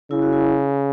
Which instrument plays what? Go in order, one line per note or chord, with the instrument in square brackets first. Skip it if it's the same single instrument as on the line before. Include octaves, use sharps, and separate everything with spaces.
[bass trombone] C#3 [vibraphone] E4
[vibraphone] F#4
E4